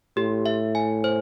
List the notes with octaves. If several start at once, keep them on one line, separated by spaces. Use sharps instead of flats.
A2 G4
E5
G#5
C5